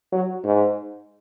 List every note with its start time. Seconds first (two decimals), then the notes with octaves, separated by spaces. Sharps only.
0.13 F#3
0.44 G#2